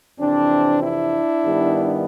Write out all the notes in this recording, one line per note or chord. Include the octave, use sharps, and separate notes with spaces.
F2 C3 E3 C4 D4
D4 E4
G2 D#3 G3 B3